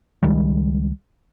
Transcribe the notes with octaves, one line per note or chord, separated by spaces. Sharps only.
C#2 D#3 G3 G#3